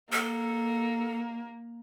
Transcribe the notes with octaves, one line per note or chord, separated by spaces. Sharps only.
A#3 A4